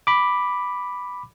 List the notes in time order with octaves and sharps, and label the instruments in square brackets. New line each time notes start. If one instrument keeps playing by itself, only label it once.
[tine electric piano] B5 D6